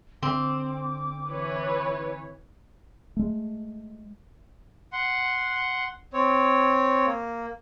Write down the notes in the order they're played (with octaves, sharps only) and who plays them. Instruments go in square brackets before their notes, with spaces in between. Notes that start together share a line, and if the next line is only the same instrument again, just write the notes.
[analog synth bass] D3 [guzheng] C4 [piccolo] D6
[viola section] E3 B4 C#5
[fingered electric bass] G#3 A3
[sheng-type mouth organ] F#5 C6
C4 C#5
A#3